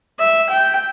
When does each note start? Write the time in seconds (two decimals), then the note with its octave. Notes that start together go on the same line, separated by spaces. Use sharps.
0.19 E5
0.50 G5